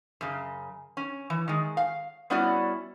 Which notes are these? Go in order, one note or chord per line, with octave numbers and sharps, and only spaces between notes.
F#2 C#3
C#4
E3
D#3 G#3
F5
G3 B3 C#4 E4 F#4 D5